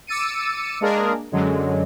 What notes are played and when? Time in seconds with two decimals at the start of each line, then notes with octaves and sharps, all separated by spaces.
0.07 D6 E6 A6 C#7 D#7
0.81 G#3 A#3 D4 G#4 A#4
1.32 F#2 D3 F#3 G#3